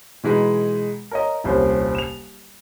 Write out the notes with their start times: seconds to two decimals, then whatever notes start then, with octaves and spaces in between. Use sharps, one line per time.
0.23 B2 E3 G#3 D#4
1.11 A#4 C#5 D#5
1.44 D#1 C2 C#4 C5
1.95 E7 F7